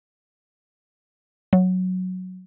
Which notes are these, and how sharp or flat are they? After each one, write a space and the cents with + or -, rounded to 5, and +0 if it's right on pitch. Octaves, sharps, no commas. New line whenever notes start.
F#3 -5